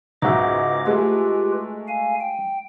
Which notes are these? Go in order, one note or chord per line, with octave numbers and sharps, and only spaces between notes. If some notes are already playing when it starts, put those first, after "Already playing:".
C#2 G#2 D#4 F#4 D#5 E5 D6
G#3 A3 F4 G4 B4
F5 G#5
G5